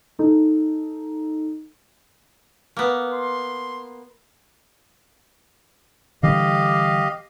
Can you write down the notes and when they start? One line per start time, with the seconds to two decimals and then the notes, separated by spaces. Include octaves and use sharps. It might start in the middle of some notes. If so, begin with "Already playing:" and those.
0.19 D#4 A4
2.77 A#3 B3
3.13 C6
6.23 D3 E3 G3 G4 D#5 F5